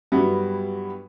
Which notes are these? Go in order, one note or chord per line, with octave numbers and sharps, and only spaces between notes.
G2 F#3 G3 B3 E4 F#4